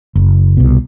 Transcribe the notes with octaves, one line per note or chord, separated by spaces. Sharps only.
F#1
C2 B2